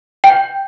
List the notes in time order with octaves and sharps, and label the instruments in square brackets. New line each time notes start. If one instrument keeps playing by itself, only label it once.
[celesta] G5